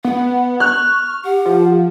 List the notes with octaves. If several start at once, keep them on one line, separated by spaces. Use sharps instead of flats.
B3 F#5
C#6 F6 F#6
G4 F#5
F3